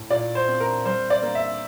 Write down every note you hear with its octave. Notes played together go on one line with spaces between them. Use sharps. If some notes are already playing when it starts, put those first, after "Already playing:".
Already playing: A2
A#2 D5
C5
C4
A#4
G3 C5
D5
A#3
E5